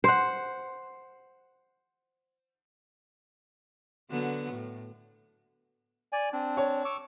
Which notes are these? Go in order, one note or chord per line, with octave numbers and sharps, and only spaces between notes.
C5 F#5
D3 F#3 B3
A2
D5 G#5
C4 D4
C#5
C#6 D6 E6